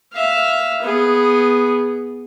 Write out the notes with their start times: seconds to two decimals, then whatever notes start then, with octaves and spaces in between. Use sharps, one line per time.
0.12 E5 F5
0.82 B3 G#4